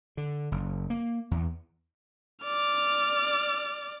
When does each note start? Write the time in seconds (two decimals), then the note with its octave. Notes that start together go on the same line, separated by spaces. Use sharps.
0.17 D3
0.52 F#1
0.90 A#3
1.31 E2
2.44 D5 F6